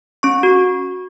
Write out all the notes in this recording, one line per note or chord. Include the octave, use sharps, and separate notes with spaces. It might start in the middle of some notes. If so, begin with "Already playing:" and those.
C#4 C#6
F#4